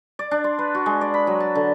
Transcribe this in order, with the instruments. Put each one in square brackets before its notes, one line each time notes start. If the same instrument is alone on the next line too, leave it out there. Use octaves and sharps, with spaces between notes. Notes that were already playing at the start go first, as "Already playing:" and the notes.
[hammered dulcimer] D5
D4
C6
B4
F#4
G#3
D5
B5
F#3
A5
D3